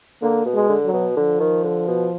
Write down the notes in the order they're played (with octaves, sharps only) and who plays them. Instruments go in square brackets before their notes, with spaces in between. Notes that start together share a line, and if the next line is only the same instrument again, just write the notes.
[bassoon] D3 [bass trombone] A#3
[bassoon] B2
[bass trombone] G#3
[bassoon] D3
[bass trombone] F#3
[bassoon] B2
[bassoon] D3 [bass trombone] F3
[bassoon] D#3
D3
B2